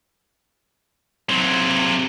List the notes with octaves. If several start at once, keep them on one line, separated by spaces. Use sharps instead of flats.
C3 F#3